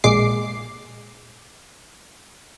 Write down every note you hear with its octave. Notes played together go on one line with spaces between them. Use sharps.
A#1 A#2 G#3 D6 C7